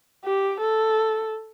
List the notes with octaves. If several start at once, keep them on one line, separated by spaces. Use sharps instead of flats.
G4
A4